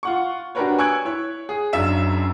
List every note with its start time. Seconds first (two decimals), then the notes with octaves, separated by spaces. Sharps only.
0.03 F4 F#5 C#6
0.55 D4 F#4 G4 A#4 B4 C#5
0.78 G#5 C#6 E6 F#6 G#6 D7
1.05 E4 C#5
1.49 G#4
1.73 F#1 F#2 D4 D#4 E5 E7